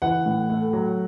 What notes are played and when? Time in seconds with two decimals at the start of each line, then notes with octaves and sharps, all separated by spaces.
0.02 E3 F#5
0.26 A2
0.50 A3
0.73 F#3